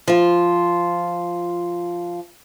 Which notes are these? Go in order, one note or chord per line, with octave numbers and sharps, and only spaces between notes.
F3 F4